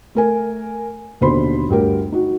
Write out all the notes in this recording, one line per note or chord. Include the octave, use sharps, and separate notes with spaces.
A3 A#4 G#5
D#2 B2 D3 C5 B5 C6
G1 D2 G4 A#4
D#4 F#4